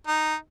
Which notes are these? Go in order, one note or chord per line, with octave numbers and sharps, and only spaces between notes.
D#4